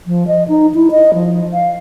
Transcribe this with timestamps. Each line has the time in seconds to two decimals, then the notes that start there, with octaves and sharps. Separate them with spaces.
0.07 F3
0.27 D#5
0.48 D#4
0.75 E4
0.91 D#5
1.14 F3
1.53 F5